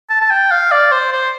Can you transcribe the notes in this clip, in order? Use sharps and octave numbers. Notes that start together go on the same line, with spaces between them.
A5
A5
G5
F5
D5
C5
C5